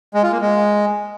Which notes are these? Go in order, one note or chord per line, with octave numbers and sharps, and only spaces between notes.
G#3
F4
A#3
G#3